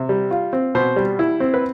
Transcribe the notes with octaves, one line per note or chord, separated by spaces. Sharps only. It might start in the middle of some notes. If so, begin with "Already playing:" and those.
Already playing: C3
G3
F4
C4
B2 C5
G3
E4
C4
B4